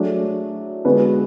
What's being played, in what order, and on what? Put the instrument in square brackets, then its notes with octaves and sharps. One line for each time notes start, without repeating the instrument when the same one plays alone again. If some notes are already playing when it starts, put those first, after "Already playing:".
Already playing: [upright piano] F#3 A3 D4 G#4 C#5
D3 G#3 B3 F#4 B4